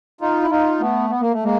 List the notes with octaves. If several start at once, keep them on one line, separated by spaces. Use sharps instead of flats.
D#4 F4
E4
D#4 F4
A3 B3
B3
A#3
A3
G#3 A#3